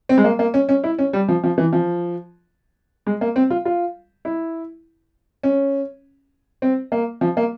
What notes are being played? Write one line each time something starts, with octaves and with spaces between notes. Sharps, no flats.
C4
G#3
A#3
A#3
C#4
C#4
E4
C#4
G3
F3
F3
E3
F3
G#3
A#3
C4
F4
F4
E4
C#4
C4
A#3
F3
A#3